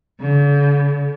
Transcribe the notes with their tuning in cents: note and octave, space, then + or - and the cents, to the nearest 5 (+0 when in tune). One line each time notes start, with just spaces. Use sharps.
D3 -45